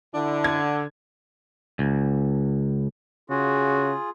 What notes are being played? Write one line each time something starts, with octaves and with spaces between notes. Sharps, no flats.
D3 D4 E4
G#6
C#2
C#3 F4 F#4 G#4